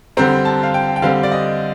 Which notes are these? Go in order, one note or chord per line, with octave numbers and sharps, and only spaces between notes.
D3 G3 C4 A#5
A5
F5
G5
G5
D3 G3 C4 F5
D5
D#5